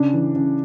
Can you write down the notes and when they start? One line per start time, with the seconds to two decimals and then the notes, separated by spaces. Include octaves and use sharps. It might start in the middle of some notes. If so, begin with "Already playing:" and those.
Already playing: C#3 D4
0.13 E3
0.36 C#3